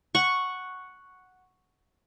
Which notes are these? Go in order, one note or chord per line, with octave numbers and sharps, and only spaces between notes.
F#5 C#6